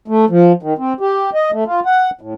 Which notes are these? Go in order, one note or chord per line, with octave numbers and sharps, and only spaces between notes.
A3
F3
D#3
C4
G4
D#5
A3
F4
F#5
A2